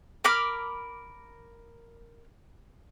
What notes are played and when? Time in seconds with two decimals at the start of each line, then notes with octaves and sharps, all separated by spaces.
0.24 A#4 B5 D6 F6